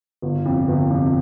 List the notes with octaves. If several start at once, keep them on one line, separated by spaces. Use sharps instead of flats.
G1
F2 C3
G1
F2 C3